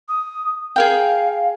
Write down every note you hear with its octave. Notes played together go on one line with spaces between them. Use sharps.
D#6
G#4 A#4 F5 G5